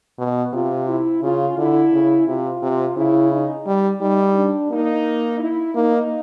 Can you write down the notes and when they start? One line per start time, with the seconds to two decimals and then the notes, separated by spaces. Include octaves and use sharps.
0.19 B2
0.53 C3 F4
0.87 E4
1.23 C#3 F4
1.58 D3 E4
1.92 C#3
2.27 C3 F4
2.62 C3
2.96 C#3 E4
3.31 D#4
3.67 G3
4.01 G3 D#4
4.35 D4
4.71 A#3 D#4
5.40 E4
5.75 A#3 D#4